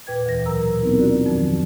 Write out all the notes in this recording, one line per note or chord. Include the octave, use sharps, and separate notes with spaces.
E2 A#2 B4 G5 G#6
D2 E3 A#6
B2 F#3 A#4 A#5 E6
B3 C4 D#4 E4 G#4 A#4
D4 F4 F#4 D5
F2 D#3 F3 F#3 F#4